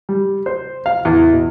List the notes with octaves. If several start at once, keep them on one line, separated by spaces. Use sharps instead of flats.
G3
C5
F5
E2
B2